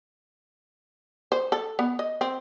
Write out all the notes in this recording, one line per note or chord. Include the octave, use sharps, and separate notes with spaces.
C5
A4
B3
D#5
C4